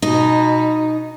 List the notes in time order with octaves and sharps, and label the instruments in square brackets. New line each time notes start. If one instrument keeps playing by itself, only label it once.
[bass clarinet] B2 [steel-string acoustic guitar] D#4